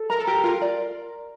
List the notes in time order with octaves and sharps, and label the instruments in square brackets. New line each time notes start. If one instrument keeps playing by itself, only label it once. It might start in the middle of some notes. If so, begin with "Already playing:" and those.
Already playing: [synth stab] A4
[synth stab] A#4 [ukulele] A#5
[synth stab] A4
[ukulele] G4 [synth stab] A#4
[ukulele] F4 [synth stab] A#4
[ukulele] D5